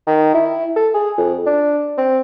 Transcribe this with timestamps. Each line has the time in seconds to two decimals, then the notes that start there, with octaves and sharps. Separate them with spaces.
0.07 D#3
0.34 E4
0.76 A4
0.94 G#4
1.18 F2
1.46 D4
1.98 C4